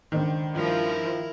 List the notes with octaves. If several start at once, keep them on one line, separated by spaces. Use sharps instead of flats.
C#2 D3 D#3 D4 C5
G2 F3 A3 E4 A#4